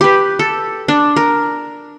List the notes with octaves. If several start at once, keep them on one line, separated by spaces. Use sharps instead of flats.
G4 B4
A4
D4
A#4